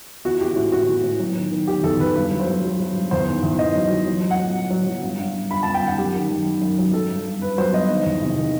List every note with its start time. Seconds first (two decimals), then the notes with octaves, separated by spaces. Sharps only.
0.25 E3 F#4
0.41 E3 G4
0.56 A2 F#4
0.72 A2 F#4
0.89 E3
1.04 A2
1.20 F#3
1.36 D#3
1.51 D#3
1.67 D#3 G4
1.83 E2 A4
2.00 E2 B4
2.15 G2 B4
2.31 F#3
2.40 C5
2.48 F#3
2.64 F#3
2.80 F#3
2.95 G2
3.11 E2 C5
3.28 D#3
3.43 E2
3.59 E2 D#5
3.76 F#3
3.91 F#3
4.07 F#3
4.23 F#3
4.31 F#5
4.40 A2
4.55 F#3
4.70 F#3
4.87 F#3
5.02 G2
5.19 G2
5.35 G2
5.51 G2 B5
5.63 A5
5.66 G2
5.74 G5
5.83 D#3 F#5
5.98 F#2 G4
6.15 D#3
6.30 F#2
6.46 F#2
6.62 F#2
6.79 F#3
6.94 F#3 A4
7.10 G2
7.26 G2
7.42 G2 B4
7.58 F#3 C5
7.73 G2 D#5
7.90 D#3
8.06 E2
8.22 C3
8.38 D#3